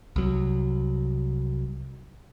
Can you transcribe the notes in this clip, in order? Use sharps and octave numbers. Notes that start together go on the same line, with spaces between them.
C2 F#3